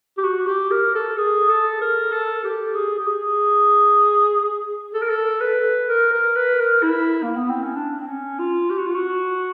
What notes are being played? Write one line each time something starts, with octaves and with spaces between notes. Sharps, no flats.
G4
F#4
G4
A#4
A4
G#4
A4
A#4
A4
G4
G#4
G4
G#4
A4
A#4
A4
B4
A#4
A#4
B4
A#4
E4
A#3
B3
C4
C#4
D4
C4
C#4
F4
G4
F#4
F4
F#4